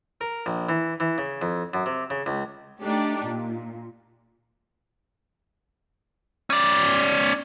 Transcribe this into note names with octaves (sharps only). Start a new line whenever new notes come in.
A#4
A#1
E3
E3
C#3
F2
F#2
C3
C#3
C#2
A3 D4 D#4 G4
A#2
C#4 D5